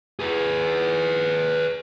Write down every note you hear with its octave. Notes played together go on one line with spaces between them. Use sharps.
G#4 B4